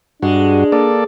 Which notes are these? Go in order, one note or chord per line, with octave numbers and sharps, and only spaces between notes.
G2 G#3 D4 F#4
A#3 A4 D5